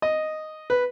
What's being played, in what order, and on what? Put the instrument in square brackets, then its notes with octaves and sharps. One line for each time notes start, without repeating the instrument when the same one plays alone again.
[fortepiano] D#5
B4